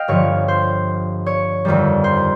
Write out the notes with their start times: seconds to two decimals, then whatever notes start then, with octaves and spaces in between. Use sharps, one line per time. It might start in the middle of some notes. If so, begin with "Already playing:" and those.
Already playing: D#5 F5 G5
0.08 G1 G2 F3 C#5
0.48 C5
1.26 C#5
1.65 G1 F2 D#3 G3
2.04 C5